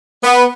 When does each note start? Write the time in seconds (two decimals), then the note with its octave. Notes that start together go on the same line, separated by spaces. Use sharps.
0.24 B3